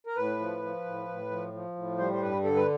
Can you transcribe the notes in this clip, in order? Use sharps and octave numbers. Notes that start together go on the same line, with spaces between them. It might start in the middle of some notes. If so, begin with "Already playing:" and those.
A#4
A2 B4
F3
F3
A2
A2
F3
F3
A2
G3 C5
C5
G2 B4
D3 A4
B4